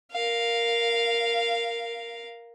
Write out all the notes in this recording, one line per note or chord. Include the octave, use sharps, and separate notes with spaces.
A#4 F5